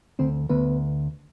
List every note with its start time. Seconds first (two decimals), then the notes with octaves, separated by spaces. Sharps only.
0.19 D2 C4 C5
0.49 D2 B3 B4